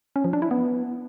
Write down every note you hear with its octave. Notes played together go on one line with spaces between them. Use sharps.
C#4
F3
D4
E4
B3